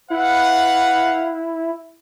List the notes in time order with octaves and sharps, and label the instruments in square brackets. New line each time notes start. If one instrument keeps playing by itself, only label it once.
[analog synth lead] E4 [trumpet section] B4 F5 F#5